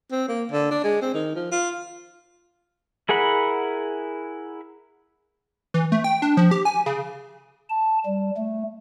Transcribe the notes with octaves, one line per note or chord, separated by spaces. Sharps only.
C4
A#3
D3
D4
G#3
C4
D#3
F3
F4
E4 G#4 A#4 F#5 B5
E3
A3
G5
D4
F3
G4
G#5
C#3
A5
G3
A3